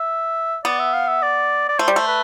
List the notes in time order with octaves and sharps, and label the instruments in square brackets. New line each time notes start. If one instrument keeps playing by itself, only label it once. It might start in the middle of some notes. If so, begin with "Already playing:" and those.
Already playing: [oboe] E5
[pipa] B3 [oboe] D5
[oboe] E5
F5
E5
D5
D5
[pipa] A3 [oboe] C5
[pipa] G3
A3
[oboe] B4